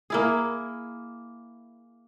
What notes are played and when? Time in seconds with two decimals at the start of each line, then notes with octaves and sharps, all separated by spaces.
0.10 A#3 E4 G#4